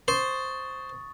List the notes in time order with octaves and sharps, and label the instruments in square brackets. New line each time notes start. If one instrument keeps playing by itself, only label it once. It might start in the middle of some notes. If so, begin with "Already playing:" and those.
[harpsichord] C5 [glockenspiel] C#6 D#6 A6